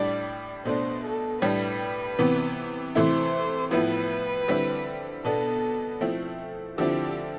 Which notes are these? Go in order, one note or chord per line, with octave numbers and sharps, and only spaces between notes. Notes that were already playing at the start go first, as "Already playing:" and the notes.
Already playing: A2 G3 D4 D5
B2 A3 D4 C5
A4
A2 G3 D4 B4
C3 E3 B3
C3 E3 A3 E4 C5
A2 F3 B3 E4 B4
D3 G3 C4 E4
B2 B3 D4 A4
F3 A3 C4 E4
D3 F3 C4 E4 G4